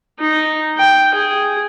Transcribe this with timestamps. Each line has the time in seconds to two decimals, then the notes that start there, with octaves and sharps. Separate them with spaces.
0.20 D#4
0.77 G5
1.15 G#4